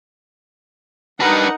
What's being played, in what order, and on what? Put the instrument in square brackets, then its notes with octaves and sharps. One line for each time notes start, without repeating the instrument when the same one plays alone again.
[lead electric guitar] D4 B4 [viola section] D#4 A#4 F#5